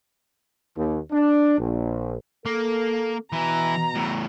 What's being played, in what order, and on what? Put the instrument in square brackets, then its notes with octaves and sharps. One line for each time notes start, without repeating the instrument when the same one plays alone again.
[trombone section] D#2
D4
A#1
[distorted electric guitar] A#3 [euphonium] A4
[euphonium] B2 [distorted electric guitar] E3 E4 [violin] A#5
[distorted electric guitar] E2 A2